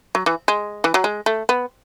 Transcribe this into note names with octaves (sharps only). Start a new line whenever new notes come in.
F#3
E3
G#3
E3
F#3
G#3
A3
B3